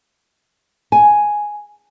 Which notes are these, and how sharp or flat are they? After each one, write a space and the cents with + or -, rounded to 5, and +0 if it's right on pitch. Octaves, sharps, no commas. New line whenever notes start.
G#5 +5